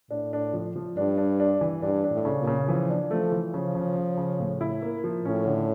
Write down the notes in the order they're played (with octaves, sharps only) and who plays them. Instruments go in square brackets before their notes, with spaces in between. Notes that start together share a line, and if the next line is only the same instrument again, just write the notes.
[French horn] A2 [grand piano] D4
[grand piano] D4
F3
F3
[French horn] G2 [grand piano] D4
[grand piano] D4
D4
E3
[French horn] G2 [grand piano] D4
[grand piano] D4
[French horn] A2
[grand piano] C#3
[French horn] A#2
[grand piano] C#3
[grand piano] E3 [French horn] F3
[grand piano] D4
[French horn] F3 [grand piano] A3
[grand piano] E3
[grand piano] C#3 [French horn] F3
[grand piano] C#3
C#3
C#3
A2
E4
A#3
F3
[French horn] A2 [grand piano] C#4
[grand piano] D3